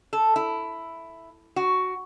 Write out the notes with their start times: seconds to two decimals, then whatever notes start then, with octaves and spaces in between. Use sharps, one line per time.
0.13 A4
0.36 E4
1.56 F#4